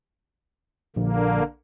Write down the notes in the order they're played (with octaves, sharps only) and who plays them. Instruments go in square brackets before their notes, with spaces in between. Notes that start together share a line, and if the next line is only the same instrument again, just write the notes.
[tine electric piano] A#1 [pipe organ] D3 A#3